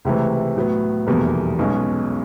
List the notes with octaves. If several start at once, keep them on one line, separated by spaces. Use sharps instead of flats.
C#2 C3 E3 A3
A2 F#3 B3
F1 E2 B2 G3 A#3
B1 B2 G#3 C#4